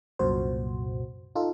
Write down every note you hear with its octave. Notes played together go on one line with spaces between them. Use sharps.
C2 F#2 A#2 F#4 C5
D#4 F4 A4